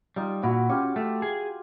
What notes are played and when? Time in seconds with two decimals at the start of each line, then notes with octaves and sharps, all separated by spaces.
0.16 G3 D#4 F4
0.43 A#2 E4 F#4
0.69 C#4 F4 G4
0.96 A3
1.22 G#4